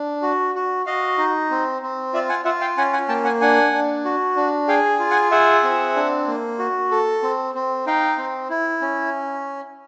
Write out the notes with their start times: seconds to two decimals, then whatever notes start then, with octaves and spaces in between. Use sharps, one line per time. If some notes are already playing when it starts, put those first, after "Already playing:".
Already playing: D4
0.22 F#4
0.55 F#4
0.86 F#4 D#5 F5
1.18 D#4
1.51 C4
1.82 C4
2.13 F4 D5 E5
2.29 F#5 G#5
2.45 F4 E5 F#5
2.61 F5 G5
2.77 C#4 F#5 G#5
2.93 F#5 G#5
3.09 A#3 G5 A5
3.24 F#5 G#5
3.41 D4 F#5 G#5
3.72 D4
4.05 F#4
4.36 D4
4.68 G#4 F5 G5
4.99 F4
5.11 F#5 G#5
5.31 G#4 E5 F#5
5.63 C4
5.96 D4
6.27 A#3
6.59 F#4
6.91 A4
7.23 C4
7.55 C4
7.87 D#4 F5 G5
8.18 C4
8.50 E4
8.82 C#4